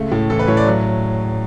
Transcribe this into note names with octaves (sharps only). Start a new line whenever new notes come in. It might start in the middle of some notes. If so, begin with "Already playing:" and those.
Already playing: C#2 A3
A2
E3 A4
B4
A2 C#5
D5
F#3